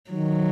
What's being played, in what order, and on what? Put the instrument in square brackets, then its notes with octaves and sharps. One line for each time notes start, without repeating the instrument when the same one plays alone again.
[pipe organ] D#3 [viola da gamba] F#3